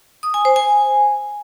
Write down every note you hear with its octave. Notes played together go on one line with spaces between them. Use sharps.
D#6
G#5
C5
G#5